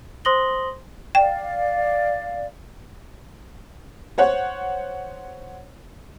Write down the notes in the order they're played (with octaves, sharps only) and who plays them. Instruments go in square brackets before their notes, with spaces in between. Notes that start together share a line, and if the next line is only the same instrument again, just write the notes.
[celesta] C5 C6 D#6 A#6 F#7 G7
[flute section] D5 F5 [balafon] G5
[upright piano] C5 C#5 F#5